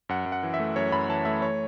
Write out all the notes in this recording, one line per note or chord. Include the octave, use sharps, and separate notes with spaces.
F#2 F#5
F#2
F#5
E3
E5
A3
F#2 C#5
F#2 B5
E3 A5
A3 E5
C#5